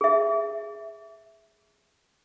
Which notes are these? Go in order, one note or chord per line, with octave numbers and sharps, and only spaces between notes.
G#4 E5